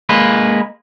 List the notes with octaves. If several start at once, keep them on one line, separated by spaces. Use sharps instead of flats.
G#3 A#3 B4